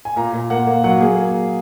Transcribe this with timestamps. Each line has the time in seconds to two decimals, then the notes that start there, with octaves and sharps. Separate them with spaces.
0.05 G#5
0.16 A#2 A#5
0.33 A#2
0.50 A#3 F#5
0.67 A#3
0.84 F#3 F#5
1.01 A#3 G#4